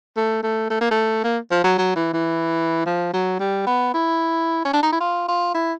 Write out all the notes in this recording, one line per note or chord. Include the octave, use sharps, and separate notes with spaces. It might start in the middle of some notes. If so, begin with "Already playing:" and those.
A3
A3
A3
A#3
A3
A#3
F3
F#3
F#3
E3
E3
F3
F#3
G3
B3
E4
C#4
D4
D#4
E4
F4
F4
E4